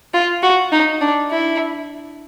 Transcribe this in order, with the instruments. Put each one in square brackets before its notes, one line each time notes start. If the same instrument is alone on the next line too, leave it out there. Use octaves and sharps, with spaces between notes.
[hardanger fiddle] F4
F#4
D#4
D4
E4